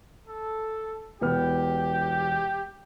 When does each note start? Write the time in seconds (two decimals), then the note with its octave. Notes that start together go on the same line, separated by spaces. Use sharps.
0.27 A4
1.21 E1 B3 G4 F6